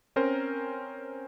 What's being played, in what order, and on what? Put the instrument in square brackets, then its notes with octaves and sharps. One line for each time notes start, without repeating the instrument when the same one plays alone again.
[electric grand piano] C4 C#4 A#4 C5